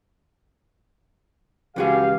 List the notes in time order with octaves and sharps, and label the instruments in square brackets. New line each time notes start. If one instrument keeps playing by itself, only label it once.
[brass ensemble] C#2 G4 F5 [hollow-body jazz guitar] E3 F#4 G#5